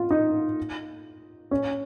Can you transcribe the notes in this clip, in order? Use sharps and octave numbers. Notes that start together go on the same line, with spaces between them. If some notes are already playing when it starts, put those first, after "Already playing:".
Already playing: F4
D#4
C#4